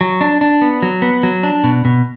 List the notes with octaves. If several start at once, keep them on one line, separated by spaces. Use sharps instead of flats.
F#3
D4
D4
B3
F#3
B3
F#3
D4
B2
B2